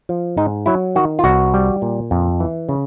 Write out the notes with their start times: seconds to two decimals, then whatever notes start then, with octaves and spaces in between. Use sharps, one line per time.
0.09 F3
0.37 G#2 D#4
0.66 F#3 E4
0.95 D#3 F#4
1.19 F4
1.24 C2 F#4
1.54 G3
1.82 A#2
2.11 F2
2.40 E3
2.69 C#3